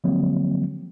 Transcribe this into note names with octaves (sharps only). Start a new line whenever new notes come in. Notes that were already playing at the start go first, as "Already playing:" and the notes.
D3 F3 F#3 G#3 A#3 C4